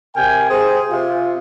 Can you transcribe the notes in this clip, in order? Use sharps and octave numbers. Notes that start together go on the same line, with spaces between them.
C3 A#4 G5 G#5
G#4 C5
C3 F4